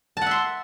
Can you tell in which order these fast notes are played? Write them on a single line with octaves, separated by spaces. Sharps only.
A5 F#5 E5 C6